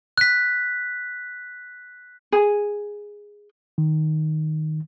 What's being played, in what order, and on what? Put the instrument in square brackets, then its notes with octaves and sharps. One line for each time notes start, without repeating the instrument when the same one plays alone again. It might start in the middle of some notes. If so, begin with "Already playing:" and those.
[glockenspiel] F#6 B6
[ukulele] G#4
[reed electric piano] D#3